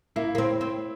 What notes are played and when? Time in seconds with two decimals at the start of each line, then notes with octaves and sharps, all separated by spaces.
0.16 A#3 E4
0.35 A#3
0.38 C4
0.61 C4